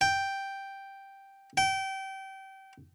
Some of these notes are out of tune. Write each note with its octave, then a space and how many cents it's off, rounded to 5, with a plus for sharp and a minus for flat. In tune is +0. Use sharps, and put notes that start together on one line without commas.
G5 +0
G5 -25